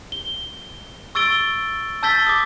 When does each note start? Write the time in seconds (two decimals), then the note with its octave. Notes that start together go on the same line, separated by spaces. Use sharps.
0.12 G7
1.15 C#6 E6 A6 D7 G7
2.03 A5 E6 G6 A6 B6 G7
2.27 D6 D#6